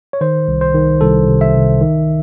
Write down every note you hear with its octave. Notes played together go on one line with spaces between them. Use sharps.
C#5
D#3 C5
C2
C5
D#3
C2 A4
C3
E5
C2
D#3